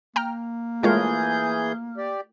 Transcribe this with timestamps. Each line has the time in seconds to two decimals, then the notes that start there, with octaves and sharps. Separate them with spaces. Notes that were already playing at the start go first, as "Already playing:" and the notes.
0.16 A#3 G5 A#5 F6
0.83 E3 G#3 A3 F4 G#4 A#4 C#5 G6
1.97 G4 D5